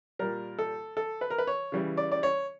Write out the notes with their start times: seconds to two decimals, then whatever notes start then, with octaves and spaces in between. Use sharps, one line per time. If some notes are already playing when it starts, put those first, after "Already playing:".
0.19 A#2 G3 A#4
0.59 A4
0.97 A4
1.21 B4
1.30 A#4
1.38 B4
1.47 C#5
1.72 C#3 E3 G3
1.97 D5
2.12 D5
2.23 C#5